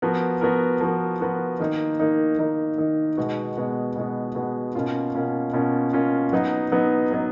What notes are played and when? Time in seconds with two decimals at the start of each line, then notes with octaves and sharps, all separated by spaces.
0.02 F3 B3 F#4 A#4
0.41 F3 B3 F#4 A#4
0.81 F3 B3 F#4 A#4
1.21 F3 B3 F#4 A#4
1.59 D#3 A#3 D#4
1.99 D#3 A#3 D#4
2.39 D#3 A#3 D#4
2.78 D#3 A#3 D#4
3.17 B2 G#3 B3 F#4
3.57 B2 G#3 B3 F#4
3.96 B2 G#3 B3 F#4
4.35 B2 G#3 B3 F#4
4.75 B2 A#3 C#4 F4
5.14 B2 A#3 C#4 F4
5.53 B2 A#3 C#4 F4
5.93 B2 A#3 C#4 F4
6.32 F#3 B3 D#4
6.72 F#3 B3 D#4
7.11 F#3 B3 D#4